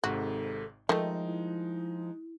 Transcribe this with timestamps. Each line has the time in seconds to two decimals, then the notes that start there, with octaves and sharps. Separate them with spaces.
0.04 G#1 G#2 C3 F#4 A4
0.89 D#3 F3 G#3 A3 D#4 D#5
1.25 E4